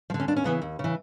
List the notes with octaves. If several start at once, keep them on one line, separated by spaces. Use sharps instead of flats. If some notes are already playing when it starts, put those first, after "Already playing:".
F3
D3
C#4
D#2 D4
C#4
C#3 E3 B3
D#2
C#3
E3